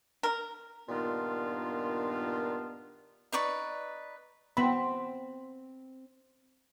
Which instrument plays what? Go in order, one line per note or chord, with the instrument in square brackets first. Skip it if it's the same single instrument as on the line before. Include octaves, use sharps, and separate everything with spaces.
[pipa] A#4
[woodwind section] G2 A#2 D#3 B3 D4 F4
[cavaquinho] D#4 B4 D5 C#6
[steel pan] B3 B5 [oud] C4 C5